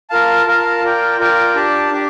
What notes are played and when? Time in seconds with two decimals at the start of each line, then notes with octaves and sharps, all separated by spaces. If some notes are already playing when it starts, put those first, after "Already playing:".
0.10 F4 A#4 F5 A5
0.46 F4 A#4 F5 A5
0.83 F4 A#4 D5 G5
1.20 F4 A#4 D5 G5
1.55 D4 G4 D5 A5
1.91 D4 G4 D5